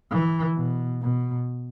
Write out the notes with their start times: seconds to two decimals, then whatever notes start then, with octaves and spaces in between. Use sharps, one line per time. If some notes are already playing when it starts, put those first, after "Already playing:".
0.11 E3
0.57 B2
1.02 B2